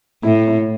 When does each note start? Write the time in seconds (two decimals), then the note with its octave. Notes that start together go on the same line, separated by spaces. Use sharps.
0.23 A2 E4
0.48 E4